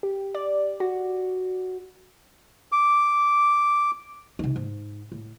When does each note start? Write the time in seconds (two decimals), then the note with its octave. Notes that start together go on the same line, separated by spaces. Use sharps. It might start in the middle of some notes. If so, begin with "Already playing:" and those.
0.03 G4
0.35 D5
0.80 F#4
2.72 D6
4.39 C3 D#4
4.56 G#2
5.12 A2